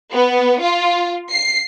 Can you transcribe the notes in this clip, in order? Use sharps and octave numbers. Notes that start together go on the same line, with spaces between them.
B3
F4
C7